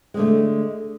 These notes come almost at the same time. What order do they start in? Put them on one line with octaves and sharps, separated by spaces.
G#3 D3 A3